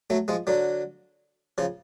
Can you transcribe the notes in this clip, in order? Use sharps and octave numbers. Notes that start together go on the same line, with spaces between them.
F#3 A3
F3 G#3
D3 F#3
C#3 F3